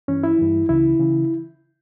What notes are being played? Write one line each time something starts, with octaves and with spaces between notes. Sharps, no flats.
G2 E3 C#4
E4
G2 E3
C#2 C#3 E3 E4
C#3 E3